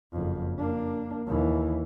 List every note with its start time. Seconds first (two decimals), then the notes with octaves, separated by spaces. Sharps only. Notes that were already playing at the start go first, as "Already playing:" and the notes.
0.12 F#1 F2
0.58 A#3 D4
1.27 D#2 E3